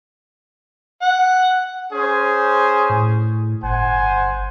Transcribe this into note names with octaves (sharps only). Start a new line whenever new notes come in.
F#5
C#4 G#4 C5
A2
G1 C5 F#5 G#5